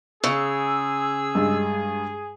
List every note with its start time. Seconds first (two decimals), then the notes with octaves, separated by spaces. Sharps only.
0.24 C#3 G#4 E6
1.35 G2 G3 G#3